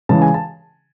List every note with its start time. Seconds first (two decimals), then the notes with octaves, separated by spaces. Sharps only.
0.09 C#3 E3 G#3 A5
0.22 G#5
0.34 A5